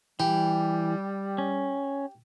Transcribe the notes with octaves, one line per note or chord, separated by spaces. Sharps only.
E3 G3 G4
C#4